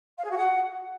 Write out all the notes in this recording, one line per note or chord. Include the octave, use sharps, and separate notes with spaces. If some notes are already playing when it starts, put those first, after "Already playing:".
F5
G#4
F#4
F#5